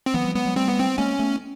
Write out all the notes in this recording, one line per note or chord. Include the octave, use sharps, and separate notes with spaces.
C4
E3 F#3 B3
F3 G3
F#3 G#3 B3
F#3 G#3
G3 A3 C4
B3
C4
G#3 A#3 C#4
A3 B3